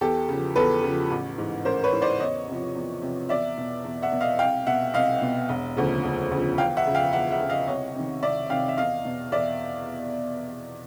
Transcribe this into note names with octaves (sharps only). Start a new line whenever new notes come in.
E2 G4 A4
C#3 F3
E2 A4 B4
C#3 F3
A1
G#2 E3
A1 A#4 C5
B4 C#5
G#2 E3
C5 D5
E2 C#5 D#5
C3 F3
E2
C3 F3
E2 D5 E5
B2
E2
E5 F#5
B2
D#5 F5
C2 F5 G5
B2 E5 F#5
C2 D#5 F5
B2
E1
D2 C#3 F3
E1
D2 C#3 F3
E2 F5 G5
E5 F#5
C#3 F3
F5 G5
E2 E5 F#5
E5 F#5
C#3 F3
D#5 F5
C2 C#5 D#5
C3 D#3
C2 D5 E5
C3 D#3 F5 G5
E5
E2 D#5 F5
B2
E2 D5 E5